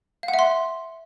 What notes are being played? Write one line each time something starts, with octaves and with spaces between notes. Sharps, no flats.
F5
F#5
E5
C6